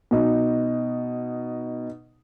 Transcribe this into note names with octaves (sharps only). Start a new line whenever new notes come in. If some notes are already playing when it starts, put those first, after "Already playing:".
B2 D#4